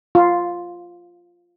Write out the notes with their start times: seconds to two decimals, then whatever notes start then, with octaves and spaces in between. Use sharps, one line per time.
0.15 F4